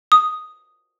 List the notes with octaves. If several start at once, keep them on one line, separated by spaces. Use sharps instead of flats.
D#6